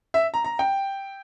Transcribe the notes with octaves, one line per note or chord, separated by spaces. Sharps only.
E5
A#5
A#5
G5